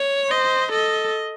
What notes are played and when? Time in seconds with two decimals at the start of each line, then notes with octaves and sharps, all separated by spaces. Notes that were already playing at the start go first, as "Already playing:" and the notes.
Already playing: C#5
0.31 C5 D#5
0.71 A4 D#5